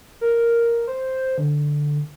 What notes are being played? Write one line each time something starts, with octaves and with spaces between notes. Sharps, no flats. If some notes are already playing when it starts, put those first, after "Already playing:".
A#4
C5
D3